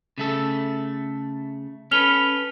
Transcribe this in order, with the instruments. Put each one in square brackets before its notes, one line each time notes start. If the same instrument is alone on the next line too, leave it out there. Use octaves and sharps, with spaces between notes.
[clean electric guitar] C#3 A3 A4
[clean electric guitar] C#4 A4 B4 [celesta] F6 F7 G7